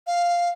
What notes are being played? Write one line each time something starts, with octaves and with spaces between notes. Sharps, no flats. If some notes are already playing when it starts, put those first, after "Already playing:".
F5